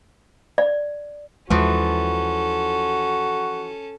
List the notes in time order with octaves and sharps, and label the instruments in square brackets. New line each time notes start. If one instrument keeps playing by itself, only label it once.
[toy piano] D5
[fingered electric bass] D#2 G#3 [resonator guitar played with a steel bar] E3 F3 [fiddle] C#4 A4 [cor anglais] F#4